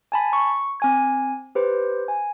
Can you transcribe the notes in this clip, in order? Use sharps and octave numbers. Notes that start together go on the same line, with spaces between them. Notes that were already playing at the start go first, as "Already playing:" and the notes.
G#5 A5 B5
C#6
C4 G#5 G#6
G4 B4 C5
G#5